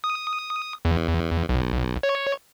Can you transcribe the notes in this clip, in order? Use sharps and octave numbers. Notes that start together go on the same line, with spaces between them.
D#6
E2
B1
C#5